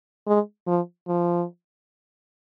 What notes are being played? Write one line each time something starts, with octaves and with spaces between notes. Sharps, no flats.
G#3
F3
F3